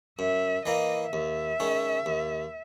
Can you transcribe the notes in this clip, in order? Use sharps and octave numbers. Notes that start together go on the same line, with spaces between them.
F#2 E5
E3 A#3 E4 D#5
D#2 E5
D#3 G#3 C#4
D#2